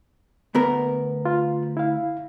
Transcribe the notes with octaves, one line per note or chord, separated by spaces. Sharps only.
D2 B3 A#4
F4
E4 F5